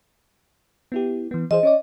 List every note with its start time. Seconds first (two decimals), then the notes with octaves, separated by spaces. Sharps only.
0.92 B3 E4 G4
1.31 E3 B3
1.51 E3 G#4 C5 D#5
1.63 C#4 C#5 D5